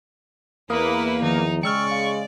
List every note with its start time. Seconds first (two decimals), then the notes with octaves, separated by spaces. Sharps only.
0.70 E2 A#3 E4 B4 D#6
1.22 D#3 F3 D#4
1.63 C#3 G#3 D5 G5 C#6 E6 F6
1.92 F5